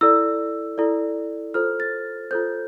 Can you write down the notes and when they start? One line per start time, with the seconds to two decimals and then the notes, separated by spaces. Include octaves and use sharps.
0.01 E4 A4 D5 E6
0.78 E4 A4 D5
1.54 F4 A4 C5 F6
1.80 A6
2.31 F4 A4 C5 G6